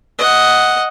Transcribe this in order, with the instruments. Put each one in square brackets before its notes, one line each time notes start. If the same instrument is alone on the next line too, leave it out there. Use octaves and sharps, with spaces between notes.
[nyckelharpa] D#5 F#5